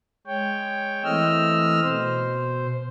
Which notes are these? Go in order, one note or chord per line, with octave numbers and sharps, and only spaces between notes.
G#3 C#5 G5
E3 A3 C4 D#5 E6 F6
B2 C5